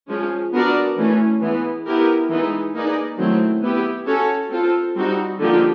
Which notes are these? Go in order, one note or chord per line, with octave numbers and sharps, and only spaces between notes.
F3 G#3 C#4
B3 D4 F#4 A#4 D5
E3 A3 C#4
E3 G#3 B3
B3 E4 G4 A#4
E3 G#3 B3 D#4
A#3 D#4 G#4 B4 D5
D#3 F#3 A3 C4 E4
B3 E4 G4
C#4 F#4 A4 C#5
C4 F4 A4
G3 C4 D#4 F#4
D3 F3 A#3 D#4 G4